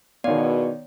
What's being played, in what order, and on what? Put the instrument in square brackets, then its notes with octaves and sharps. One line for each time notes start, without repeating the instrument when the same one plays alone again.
[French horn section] E2 B2 [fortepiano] D#3 C#5 F5 [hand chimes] B3 D5